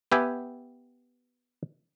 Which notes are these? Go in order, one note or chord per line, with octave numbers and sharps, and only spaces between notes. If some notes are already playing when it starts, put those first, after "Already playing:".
B3 G4 B4 E5 G5 G#5